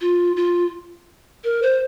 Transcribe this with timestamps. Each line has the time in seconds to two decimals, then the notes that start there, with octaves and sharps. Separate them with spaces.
0.01 F4
0.37 F4
1.44 A#4
1.62 C5